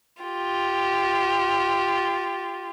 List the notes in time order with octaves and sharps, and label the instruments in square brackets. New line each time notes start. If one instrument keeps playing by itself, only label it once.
[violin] F4 G4